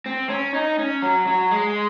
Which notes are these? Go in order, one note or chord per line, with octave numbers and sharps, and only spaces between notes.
C4
C#4
D#4
C#4
F#3
F#3
G#3